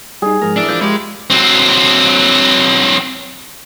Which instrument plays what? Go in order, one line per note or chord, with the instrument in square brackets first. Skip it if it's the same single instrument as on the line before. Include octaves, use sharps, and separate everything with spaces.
[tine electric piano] G3 D#4 [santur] G#4
[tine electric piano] G#2 F3 G#3 [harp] A#4
[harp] E3 E4 [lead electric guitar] D4
[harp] F3 [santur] E5 [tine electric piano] G6
[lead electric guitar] G#3 [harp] G4 G#4 [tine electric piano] B5
[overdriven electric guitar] F#3 C4